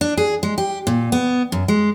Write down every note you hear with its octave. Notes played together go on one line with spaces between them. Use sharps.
D4
G#4
G#3
G4
A#2
B3
F#2
G#3